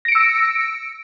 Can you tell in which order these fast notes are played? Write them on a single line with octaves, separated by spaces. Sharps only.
A#6 D7 C#7 E6